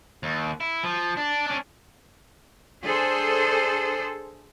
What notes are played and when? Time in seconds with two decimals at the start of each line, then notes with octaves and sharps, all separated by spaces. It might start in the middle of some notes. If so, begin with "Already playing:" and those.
0.23 D#2
0.60 E4
0.83 F3
1.17 D4
1.47 C#4 D4
2.83 D4 G#4 A4 C5